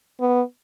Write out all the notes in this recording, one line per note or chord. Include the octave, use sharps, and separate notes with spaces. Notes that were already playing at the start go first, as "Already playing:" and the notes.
B3